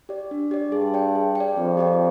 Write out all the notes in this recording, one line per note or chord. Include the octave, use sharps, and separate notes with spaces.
G4 D5
D4
G4 D5
G2 G#4
D5 G5
G#4
D5 G5
F2 C4
G4 D5 G5